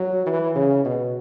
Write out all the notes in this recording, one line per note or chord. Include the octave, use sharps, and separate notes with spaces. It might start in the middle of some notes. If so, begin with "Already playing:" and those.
Already playing: F#3
E3
C#3
B2